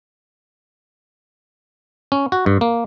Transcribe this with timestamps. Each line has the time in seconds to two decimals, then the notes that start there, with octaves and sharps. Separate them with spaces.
2.12 C#4
2.32 F#4
2.46 G2
2.61 A#3